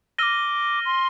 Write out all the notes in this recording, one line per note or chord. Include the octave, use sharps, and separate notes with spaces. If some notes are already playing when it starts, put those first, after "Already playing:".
D6 E6 F6 A#6 D#7 G7
C6